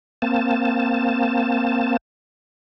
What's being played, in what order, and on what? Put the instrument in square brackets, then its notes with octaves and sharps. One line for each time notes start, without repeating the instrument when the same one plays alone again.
[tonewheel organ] A#3 C4 A5